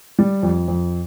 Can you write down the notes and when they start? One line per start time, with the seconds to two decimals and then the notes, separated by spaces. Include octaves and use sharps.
0.19 G3
0.43 F2
0.68 F2